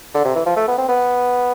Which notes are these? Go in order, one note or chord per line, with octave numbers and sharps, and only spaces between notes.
D3
C3
E3
F3
A3
B3
C4
B3